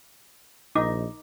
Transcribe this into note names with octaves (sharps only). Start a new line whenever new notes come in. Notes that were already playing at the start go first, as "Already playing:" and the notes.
A#1 D#4 D6